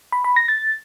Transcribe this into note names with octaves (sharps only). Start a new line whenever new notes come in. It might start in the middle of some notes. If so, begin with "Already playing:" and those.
B5
B5
A#6
A6